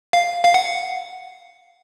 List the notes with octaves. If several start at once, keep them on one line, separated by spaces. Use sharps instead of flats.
F5
F5
F#5